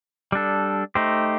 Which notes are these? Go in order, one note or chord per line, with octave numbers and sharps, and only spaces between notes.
G3 D4 A4
A3 D#4 G4 C5